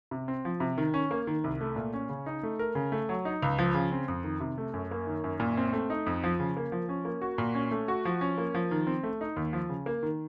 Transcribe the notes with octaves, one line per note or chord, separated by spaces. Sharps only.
C3
C4
F3
C3
D#3
C#4
A#3
D#3
C2
A3
A#2
C#4
C#3
D#4
A3
A#4
C#3
A3
F#3
D#4
C#2
F3
C#3
C4
F2
D#3
C3
A3
F#2
A#3
D#3
F#2
A#2
C4
A3
D#4
F2
F3
C#3
A#3
F3
C#4
A#3
F#4
A#2
C#4
A3
F#4
F3
C#4
A#3
F3
D#3
C4
A3
D#4
D#2
F3
C#3
A#3
D#3